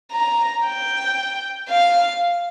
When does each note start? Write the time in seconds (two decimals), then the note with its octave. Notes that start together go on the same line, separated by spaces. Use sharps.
0.12 A#5
0.65 G5
1.68 F5